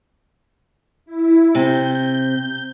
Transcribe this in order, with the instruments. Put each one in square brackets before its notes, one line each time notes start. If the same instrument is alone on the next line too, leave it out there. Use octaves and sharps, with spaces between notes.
[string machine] E4
[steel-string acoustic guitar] C3 [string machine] G6